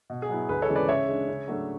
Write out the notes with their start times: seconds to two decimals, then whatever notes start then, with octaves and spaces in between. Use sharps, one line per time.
0.10 B2
0.22 G#4
0.29 F#3 B3 E4
0.49 D2 G#4 B4
0.62 A4 C#5
0.68 C#3 E3 G#3
0.75 B4 D5
0.89 C#3 C#5 E5
1.08 G#3 D4
1.28 C#3
1.48 F#3 A3 D4